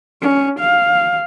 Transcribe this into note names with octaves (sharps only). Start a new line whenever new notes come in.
C#4
F5